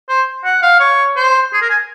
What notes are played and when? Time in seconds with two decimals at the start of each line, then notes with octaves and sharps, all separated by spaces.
0.09 C5
0.44 F#5
0.62 F5
0.80 C#5
1.16 C5
1.53 G#4
1.61 A#4
1.70 G#5